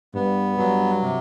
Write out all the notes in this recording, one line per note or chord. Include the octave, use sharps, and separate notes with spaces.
G2 B3
G2 F#3
C3